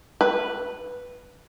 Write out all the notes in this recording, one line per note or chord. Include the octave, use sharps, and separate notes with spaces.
B4